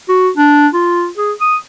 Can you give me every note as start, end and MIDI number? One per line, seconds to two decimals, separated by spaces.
0.09 0.30 66
0.37 0.68 62
0.73 1.08 65
1.17 1.32 68
1.41 1.56 87